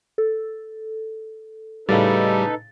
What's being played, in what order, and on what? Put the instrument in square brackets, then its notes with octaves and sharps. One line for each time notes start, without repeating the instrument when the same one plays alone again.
[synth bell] A4
[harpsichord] A2 C#3 [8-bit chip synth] G3 [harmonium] D#4 A4 B4 [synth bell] A6